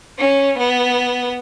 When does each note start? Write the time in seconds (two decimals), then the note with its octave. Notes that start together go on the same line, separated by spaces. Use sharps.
0.19 C#4
0.59 B3